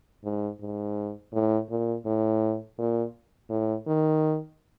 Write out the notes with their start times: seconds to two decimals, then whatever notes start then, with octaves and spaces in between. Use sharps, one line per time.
0.24 G#2
0.61 G#2
1.33 A2
1.70 A#2
2.06 A2
2.78 A#2
3.50 A2
3.87 D#3